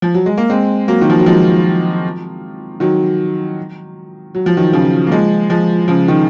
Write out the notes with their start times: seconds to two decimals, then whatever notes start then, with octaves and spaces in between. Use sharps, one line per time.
0.02 F3
0.14 F#3
0.26 G#3
0.38 A#3
0.50 G#3 C4
0.88 F#3 A#3
1.02 D#3
1.10 F3
1.19 F#3
1.26 F3 G#3
2.80 D#3 F#3
4.35 F#3
4.46 F3
4.57 D#3 F#3
4.73 C#3 F3
5.07 A#3
5.11 F3 G#3
5.50 F3 G#3
5.88 C#3 F3
6.08 D#3